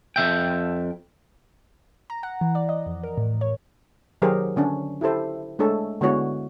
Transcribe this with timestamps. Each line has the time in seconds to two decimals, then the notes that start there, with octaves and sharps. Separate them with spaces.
0.16 F2 E5 G5
2.10 A#5
2.23 F#5
2.41 E3
2.55 D5
2.69 D#5
2.86 F2
3.03 A#4
3.18 A2
3.41 C#5
4.22 D#3 F#3 G4 G#4 A#4 C5
4.56 D3 C#4 D4
5.01 E4 G4 A4 C5
5.59 G#3 A3 D4 A4 C#5
6.01 D3 G#3 B3 E4 F#4 C#5